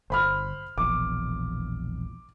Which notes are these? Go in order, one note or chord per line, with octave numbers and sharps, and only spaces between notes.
G1 C5 B5 F6
E1 A#1 E2 D6